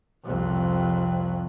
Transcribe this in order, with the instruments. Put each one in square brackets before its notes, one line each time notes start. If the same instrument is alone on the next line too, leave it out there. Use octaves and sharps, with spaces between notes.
[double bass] C2 F2